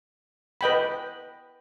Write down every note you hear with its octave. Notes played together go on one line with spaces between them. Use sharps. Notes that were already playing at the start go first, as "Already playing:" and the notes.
B4 D#5 G5 B5